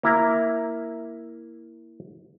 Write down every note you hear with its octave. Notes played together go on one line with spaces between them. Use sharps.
A#3 E4 A#5